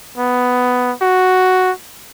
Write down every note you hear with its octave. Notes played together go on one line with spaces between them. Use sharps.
B3
F#4